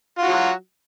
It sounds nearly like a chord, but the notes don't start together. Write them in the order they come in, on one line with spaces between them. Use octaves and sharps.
F4 F#4 F#3